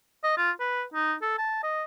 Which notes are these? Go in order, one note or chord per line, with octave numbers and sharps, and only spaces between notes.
D#5
F4
B4
D#4
A4
A5
D#5